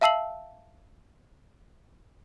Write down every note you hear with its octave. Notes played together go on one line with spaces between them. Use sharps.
E5 F5 A5 E6 C7 F#7